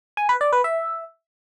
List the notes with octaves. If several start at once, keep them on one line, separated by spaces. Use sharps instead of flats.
G#5
B4
D5
B4
E5